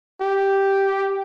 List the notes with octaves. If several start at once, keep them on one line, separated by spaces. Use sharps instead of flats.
G4